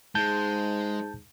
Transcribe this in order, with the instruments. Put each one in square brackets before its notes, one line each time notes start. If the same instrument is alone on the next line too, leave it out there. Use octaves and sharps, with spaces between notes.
[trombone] G#2 [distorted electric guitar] G#3 [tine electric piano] A5 G6